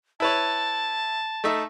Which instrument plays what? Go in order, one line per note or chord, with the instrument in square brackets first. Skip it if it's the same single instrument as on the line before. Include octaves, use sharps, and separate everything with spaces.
[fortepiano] E4 B4 C#5 [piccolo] A5
[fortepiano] A3 D#4 E5